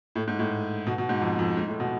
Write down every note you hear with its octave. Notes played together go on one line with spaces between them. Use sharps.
A2
G#2
A2
B2
B2
G#2
F2
F2
G#2
A2
B2